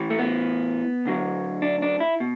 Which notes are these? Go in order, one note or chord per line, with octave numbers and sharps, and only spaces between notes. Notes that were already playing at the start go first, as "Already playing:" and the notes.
Already playing: A2 E3
A3
B3
D2 D3 F#3
D4
D4
E4
B2